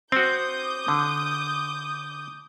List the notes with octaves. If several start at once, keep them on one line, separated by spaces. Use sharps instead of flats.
C4 F#4 D6 D#6 G6
D3